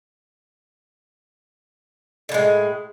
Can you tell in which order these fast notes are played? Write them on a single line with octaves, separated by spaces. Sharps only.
D3 A2 G#3